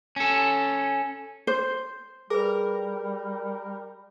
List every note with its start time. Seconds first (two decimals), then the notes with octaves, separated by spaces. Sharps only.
0.16 C#4 A4
1.47 C5
2.30 G3 G#4 A#4 B4